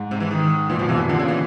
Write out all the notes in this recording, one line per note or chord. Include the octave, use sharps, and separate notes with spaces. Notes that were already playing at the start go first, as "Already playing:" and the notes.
Already playing: G#2
C3
E3
D#3
A#2 E3
B2 F3
C3 E3
A#2
D3
C#3
E3